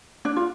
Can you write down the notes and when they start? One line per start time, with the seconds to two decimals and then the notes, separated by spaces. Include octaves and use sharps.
0.25 D4
0.36 F4